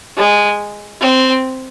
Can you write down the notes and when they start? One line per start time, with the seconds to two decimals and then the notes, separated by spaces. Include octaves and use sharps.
0.17 G#3
1.01 C4